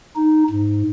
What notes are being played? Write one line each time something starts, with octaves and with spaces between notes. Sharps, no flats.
D#4
G#2